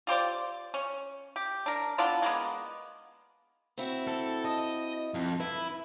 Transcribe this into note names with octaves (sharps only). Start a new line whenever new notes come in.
F4 G4 C5 D5
C#4
G4
D4 A#4
B3 D4 E4 F4
G#3 A#3 B3
C4 E4 F#4
A4
D#5
F2
E4 B4